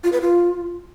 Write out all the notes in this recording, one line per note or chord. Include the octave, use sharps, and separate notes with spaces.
F4
B4
F4